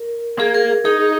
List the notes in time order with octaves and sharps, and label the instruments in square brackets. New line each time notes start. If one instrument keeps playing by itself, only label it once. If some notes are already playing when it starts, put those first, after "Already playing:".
Already playing: [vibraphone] A#4
[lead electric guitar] A#3 [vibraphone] G#4
[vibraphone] A#4
[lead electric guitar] D#4 [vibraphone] G#4